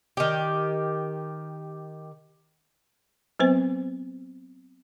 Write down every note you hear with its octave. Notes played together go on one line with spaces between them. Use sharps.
D#3 G4
F#3 B3 C4 B4 C5